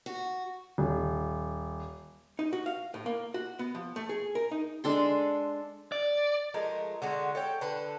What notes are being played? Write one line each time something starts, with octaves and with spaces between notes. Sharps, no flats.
F#4
D#1
D#4
F#4
F5
A2
A#3
F#4
B3
F3
A3
G#4
A#4
D#4
G#3 D4 A4 C6
D5
F3 G#3 A3 A#4
D3 G#3 F#4
A4 C#5 G5
D3 A4 B4